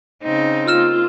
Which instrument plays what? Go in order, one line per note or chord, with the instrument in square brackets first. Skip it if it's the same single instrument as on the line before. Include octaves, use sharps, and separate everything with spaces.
[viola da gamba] C#3 C4 D#4
[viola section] A#3 F4 [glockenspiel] E6 F6 E7